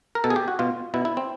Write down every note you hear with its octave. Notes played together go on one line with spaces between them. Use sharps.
A#4
B2 A4
G#4
G4
F#4
B2 F4
B2 E4
E4
C4